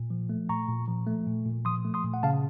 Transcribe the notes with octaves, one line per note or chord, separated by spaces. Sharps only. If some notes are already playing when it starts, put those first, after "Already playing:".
Already playing: A#2
F3
A3
A#2 A#5 C#6
A#2
F3
A3
A#2
A#2
F3 C6 D#6
A3
C6 D#6
A#2
F#5
C#3 F5 A5